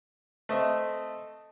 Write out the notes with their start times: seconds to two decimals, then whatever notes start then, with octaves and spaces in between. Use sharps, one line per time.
0.49 A3 C4 D#5 E5